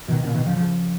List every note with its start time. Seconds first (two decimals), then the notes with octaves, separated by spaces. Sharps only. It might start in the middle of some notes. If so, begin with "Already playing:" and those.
0.08 B2 D#3
0.24 A#2 C#3
0.34 B2 D#3
0.45 C#3 F3
0.56 C#3 F3